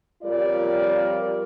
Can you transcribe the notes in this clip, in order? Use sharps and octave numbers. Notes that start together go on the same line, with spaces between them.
F2 G3 F4 A#4 C#5 D5